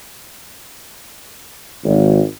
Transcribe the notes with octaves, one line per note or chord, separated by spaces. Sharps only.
G#1